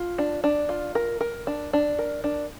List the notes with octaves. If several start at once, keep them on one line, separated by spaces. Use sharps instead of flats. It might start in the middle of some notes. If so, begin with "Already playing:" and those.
Already playing: F4
D4
D4
F4
A#4
A#4
D4
D4
A#4
D4